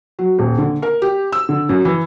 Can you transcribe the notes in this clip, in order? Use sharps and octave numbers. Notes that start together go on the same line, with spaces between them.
F#3
D#1
D3
A#4
G4
E6
D3
F#2
E3